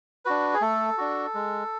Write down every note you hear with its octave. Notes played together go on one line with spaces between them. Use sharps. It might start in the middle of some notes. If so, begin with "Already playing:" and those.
D4 F#4 B4
G#4
A3 A4
D4 F#4
G#3